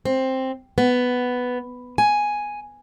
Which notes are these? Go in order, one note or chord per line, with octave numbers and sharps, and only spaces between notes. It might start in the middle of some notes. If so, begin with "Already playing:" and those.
C4
B3
G#5